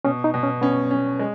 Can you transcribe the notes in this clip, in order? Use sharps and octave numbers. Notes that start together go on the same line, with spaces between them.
B2 C#4
D#4
B2
C#4
B3 C#4
C#4
G#3